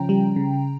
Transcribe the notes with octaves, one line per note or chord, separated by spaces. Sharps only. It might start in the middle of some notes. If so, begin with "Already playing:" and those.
Already playing: C#3 F3 C#4 G5 A#5
G3
C#3